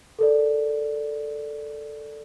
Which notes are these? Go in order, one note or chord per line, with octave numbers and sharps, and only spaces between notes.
A4 A#4 D5